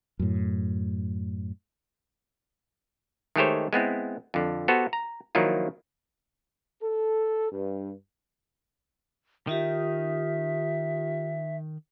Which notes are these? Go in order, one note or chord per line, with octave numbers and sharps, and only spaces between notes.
F#2 A2
D#3 G#3 A3 G4 C5 C#5
G#3 B3 C4 E4
F2 D3
B3 F#4 G4 A4 C5
A#5
D#3 F3 F#3 A#3 E4 F4
A4
G2
D#3 D#4 F4 G4 E5